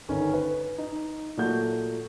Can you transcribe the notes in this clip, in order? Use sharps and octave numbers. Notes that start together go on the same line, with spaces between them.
G1 D#3 C#4
B4
D#4
A#2 F#3 A3 F#4 G6